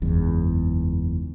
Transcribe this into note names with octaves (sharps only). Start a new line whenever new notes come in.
F#1 E2 G#2